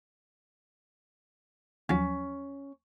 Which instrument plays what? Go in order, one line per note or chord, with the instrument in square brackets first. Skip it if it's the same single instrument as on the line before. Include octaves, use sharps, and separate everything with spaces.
[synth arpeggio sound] D#2 F3 F#3 [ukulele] C#4